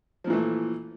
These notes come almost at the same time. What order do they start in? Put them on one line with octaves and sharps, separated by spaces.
F3 A#2 E3 A3